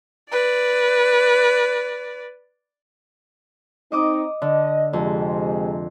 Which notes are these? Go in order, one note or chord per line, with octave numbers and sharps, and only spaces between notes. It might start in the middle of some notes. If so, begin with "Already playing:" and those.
B4 D5
C4 D#4 D#5 D6 D#6
D3 D#5
F2 C3 G#3